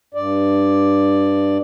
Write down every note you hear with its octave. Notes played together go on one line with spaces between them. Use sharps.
G2 D5